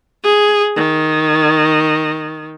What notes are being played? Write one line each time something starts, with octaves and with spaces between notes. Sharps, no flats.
G#4
D#3